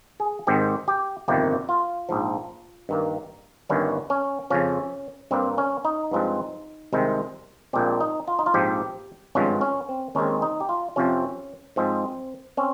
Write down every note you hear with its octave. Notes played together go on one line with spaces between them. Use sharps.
G#4
G#1 G#2 D#3 G#3 C4 G4
G4
G1 F2 C3 D#3 A#3 G4
F4
A#1 G#2 F3
G2 D#3 A#3
G1 G2 D#3 G3 C#4
C#4
F2 C#3 F3 C#4
G2 G3 A#3 C4
C#4
D#4
G2 F3 G#3 C4
C2 C3 D#3 G#3 C4
A#1 A#2 G#3 C4 G4
D#4
F4
D#4
F4
A#1 G#2 F3 C4 G4
G#1 G2 F3 G#3 C4 C#4
C#4
C4
D#2 D#3 G#3 C4 C#4
D#4
G4
F4
F2 C3 F3 C4 C#4
G#2 F3 G#3 C4
C4 C#4